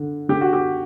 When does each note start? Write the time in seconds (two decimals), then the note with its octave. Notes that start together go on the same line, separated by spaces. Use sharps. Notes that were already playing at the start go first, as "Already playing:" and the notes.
Already playing: D3
0.29 D3 G4
0.41 F#4
0.53 G4